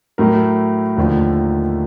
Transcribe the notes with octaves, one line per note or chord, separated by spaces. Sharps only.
A2 F#3 A3 A#4
D#2 D3 F3 A3